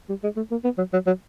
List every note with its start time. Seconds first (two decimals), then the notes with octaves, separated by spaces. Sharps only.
0.09 G3
0.24 G#3
0.37 A3
0.51 A#3
0.64 B3
0.78 F#3
0.93 F#3
1.07 F#3